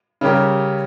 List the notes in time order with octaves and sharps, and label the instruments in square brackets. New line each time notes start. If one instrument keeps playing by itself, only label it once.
[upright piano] C#3 G3 C#4 G4 A#4